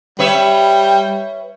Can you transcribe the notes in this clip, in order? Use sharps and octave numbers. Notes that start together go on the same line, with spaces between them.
G3 B4 C#5 E5